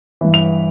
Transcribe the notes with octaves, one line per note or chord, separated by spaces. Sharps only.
G2 E3
F7